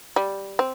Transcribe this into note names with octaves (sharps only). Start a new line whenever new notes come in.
G3
C4